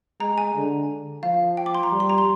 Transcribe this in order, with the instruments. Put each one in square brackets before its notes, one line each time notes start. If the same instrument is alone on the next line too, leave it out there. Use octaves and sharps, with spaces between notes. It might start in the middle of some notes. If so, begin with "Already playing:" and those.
[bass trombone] G#3 [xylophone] A#5
[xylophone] G#5
[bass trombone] D3
[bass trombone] F3 [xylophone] F5
[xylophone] G5
D6
C6
A#5
[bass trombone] G3
[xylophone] C6
A#5
C6